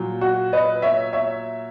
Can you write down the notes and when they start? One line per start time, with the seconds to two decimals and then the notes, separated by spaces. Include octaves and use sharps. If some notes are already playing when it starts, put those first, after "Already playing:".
Already playing: A#2 F#3
0.21 F#4
0.53 B4 D#5
0.82 C#5 E5
1.13 C#5 E5